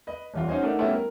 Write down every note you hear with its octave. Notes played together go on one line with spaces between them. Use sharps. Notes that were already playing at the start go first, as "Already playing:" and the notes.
B4 D#5
D#1 E2 F4
C#4 D#4 F#4 C5 D#5 G#5
A3 D4 D#4 A#4 D5 F#5
G3 A3 B3 C#4 E4 G5
A#4